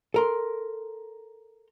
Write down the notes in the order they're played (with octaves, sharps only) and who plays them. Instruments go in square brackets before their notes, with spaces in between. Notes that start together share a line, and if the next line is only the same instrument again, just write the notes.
[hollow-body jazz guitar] A4 A#4 C6